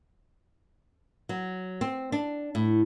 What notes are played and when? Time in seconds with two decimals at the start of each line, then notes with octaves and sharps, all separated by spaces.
1.29 F#3
1.81 C4
2.12 D4
2.55 A2